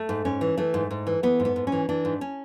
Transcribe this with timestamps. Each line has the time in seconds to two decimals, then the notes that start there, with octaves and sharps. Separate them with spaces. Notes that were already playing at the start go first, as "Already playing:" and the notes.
Already playing: A3
0.09 G#2
0.25 G#2 C#4
0.41 E3
0.57 E3 A3
0.74 G#2
0.91 G#2
1.07 E3
1.23 E3 B3
1.40 G#2
1.45 B3
1.56 G#2
1.67 C#4
1.72 E3
1.89 E3 D4
2.05 G#2
2.21 C#4